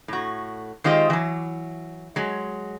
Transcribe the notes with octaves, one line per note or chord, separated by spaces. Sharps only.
A2 F#4
D#3 G#3 C4 F4 G4 D#5
E3 F#3
F#3 G#3